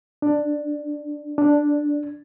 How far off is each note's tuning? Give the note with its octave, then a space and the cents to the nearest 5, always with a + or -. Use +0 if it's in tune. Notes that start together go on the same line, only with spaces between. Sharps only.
D4 +10
D4 +0